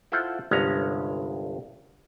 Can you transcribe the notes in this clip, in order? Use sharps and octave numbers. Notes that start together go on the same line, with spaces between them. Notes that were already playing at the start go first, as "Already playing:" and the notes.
E4 F4 A4 C5 E5 F#5
G1 C2 G2 G#3 C#4 A#5